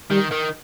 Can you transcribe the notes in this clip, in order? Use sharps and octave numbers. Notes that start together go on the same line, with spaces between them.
D#3 G3
D#3